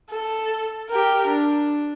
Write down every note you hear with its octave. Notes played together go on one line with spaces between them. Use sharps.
A4
G4 A#4
D4